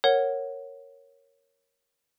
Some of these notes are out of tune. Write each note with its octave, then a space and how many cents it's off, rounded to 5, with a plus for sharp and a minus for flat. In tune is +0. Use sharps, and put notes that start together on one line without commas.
A#4 -5 C#5 -10 F#5 +0